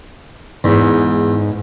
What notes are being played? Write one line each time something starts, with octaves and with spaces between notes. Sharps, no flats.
E2 G#2